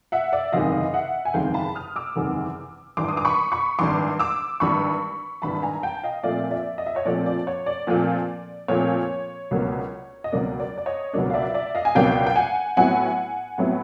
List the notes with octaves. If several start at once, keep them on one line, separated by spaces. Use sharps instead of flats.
E5 F#5
D5 E5
F#1 E2 C3 D#3 G#3 D#5 F5
E5 F#5
G#5
F#1 E2 C3 D#3 G#3 F5 G5
A5 B5
D#6 F6
D6 E6
F#1 E2 C3 D#3 G#3
G#1 G2 E3 C6 D6
D#6
D6
B5 C#6
B5 C#6
G#1 G2 E3 C6 D6
D6 E6
G#1 G2 E3 B5 C#6
G#1 G2 E3 A5 B5
A5
G#5 A#5
G5 A5
D#5 F5
A#2 F3 A3 C4 F4 D5 E5
D5 E5
D#5
E5
C#5 D#5
A#2 F3 A3 C4 F4 D5
D5
C#5
D5
A#2 F3 A3 C4 F4
A#2 F3 A3 C4 F4 C#5
C#2 B2 F#3 A#3 D4
D#5
C#2 B2 F#3 A#3 D4 D5
D5
D5
C#5 D#5
C#2 B2 F#3 A#3 D4
F5
D5 E5
D5 E5
D#5 F5
G#5
C#2 B2 F#3 A#3 D4 F5 G5
G5
F#5 G#5
A2 F#3 B3 E4 F#5 G#5
A2 F#3 B3 E4